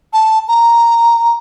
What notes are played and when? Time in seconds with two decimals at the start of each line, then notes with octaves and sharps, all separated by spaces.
0.13 A5
0.48 A#5